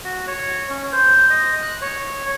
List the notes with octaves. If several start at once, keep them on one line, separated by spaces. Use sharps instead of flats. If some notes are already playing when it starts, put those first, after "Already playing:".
F#4
C#5
C#4
C5
D#5
F#6
C#5